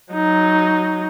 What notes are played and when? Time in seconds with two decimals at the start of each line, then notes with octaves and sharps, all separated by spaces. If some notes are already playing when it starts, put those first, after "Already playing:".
0.13 F#3 D#4